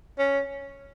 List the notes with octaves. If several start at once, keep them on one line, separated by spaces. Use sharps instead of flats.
C#4